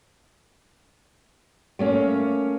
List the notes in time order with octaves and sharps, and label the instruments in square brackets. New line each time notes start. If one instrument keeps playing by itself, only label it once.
[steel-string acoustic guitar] A3 A#3 C#4